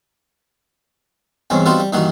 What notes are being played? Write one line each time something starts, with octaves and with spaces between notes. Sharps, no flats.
E2 G2 C3 G#3 C#4
G3 B3 C4 D#4 F4 F#4
G3
G2 A#2 D#3 E3 D#4 F#4